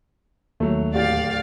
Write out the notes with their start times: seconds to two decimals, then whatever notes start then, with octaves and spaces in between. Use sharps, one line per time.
0.60 D#2 F#3 A3
0.94 D1 G4 D5 F5 A6